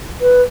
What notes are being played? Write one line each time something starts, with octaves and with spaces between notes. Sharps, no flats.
B4